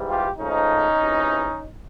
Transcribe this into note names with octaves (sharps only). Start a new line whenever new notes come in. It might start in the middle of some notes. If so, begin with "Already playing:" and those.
Already playing: G#2 E3 G3
F4 G4
G#2 F3 A3 C#4 D#4
C#2 C3 E3